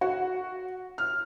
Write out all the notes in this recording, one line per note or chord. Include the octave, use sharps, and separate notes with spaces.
F#4
F6